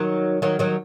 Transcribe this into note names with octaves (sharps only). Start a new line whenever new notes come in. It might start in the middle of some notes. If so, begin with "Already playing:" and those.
Already playing: D#3 F#3
D#3 F#3
D#3 F#3